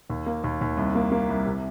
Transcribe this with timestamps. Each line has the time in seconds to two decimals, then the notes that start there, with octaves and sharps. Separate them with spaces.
0.10 D#2
0.26 A#3
0.44 D#2
0.61 D#2
0.77 C2
0.95 A#3
1.12 A#3
1.29 C2
1.46 C3